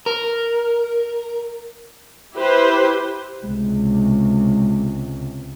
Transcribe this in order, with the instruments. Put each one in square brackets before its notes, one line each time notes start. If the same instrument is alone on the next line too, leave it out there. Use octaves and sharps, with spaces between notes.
[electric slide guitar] A#4
[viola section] E4 G4 B4 C5
[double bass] C#2 C3 [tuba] G#3